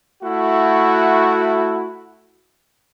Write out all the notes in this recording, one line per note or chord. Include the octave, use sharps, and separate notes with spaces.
A3 E4 F#4